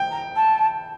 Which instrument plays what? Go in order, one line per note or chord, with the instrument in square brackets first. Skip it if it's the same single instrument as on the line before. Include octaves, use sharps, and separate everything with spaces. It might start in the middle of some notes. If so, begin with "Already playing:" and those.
Already playing: [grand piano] G5
[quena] A#5
A5